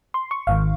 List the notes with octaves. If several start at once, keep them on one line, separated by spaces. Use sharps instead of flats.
C6
C#6
G#1 G#2 D#3 F5